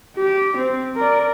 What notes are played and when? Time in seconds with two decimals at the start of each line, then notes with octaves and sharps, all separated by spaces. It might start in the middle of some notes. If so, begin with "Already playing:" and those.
0.18 G4
0.57 C4
0.96 A#4 D5